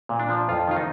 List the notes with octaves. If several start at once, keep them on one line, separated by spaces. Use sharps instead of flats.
A#2
D4
F3
F2 F4
D#3 F4
D#4